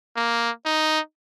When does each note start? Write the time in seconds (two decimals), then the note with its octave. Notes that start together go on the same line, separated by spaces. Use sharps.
0.16 A#3
0.65 D#4